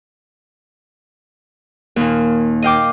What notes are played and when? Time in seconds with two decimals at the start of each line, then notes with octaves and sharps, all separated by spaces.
1.96 D#2 A#2
2.62 D#5 F5 G5 D6